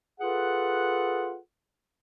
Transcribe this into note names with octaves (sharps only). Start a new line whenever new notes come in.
F4 G#4 A4 B4 F#5